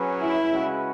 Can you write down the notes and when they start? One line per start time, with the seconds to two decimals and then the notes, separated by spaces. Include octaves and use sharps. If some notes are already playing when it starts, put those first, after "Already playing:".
Already playing: F#3 C#4 G#4 B4
0.21 E4
0.51 C#3 G#3 C#4 F#4 B4